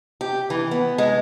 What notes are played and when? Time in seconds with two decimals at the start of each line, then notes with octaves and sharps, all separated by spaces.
0.21 G4
0.50 E3
0.71 B3
0.98 G#3